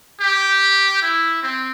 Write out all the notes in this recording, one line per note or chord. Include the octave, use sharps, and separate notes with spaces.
G4
E4
C4